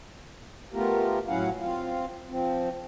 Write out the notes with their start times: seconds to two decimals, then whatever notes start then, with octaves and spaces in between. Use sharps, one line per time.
0.73 A3 B3 F4 G4 A#4
1.28 A2 F#3 C#4 E4 F5 F#5
1.61 C4 F4 F5
2.30 F3 C4